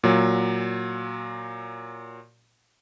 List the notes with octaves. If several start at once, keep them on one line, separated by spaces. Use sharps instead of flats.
A#2 F#3